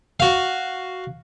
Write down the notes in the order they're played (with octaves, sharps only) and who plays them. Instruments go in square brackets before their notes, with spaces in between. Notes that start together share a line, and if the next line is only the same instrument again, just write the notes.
[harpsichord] F#4 F5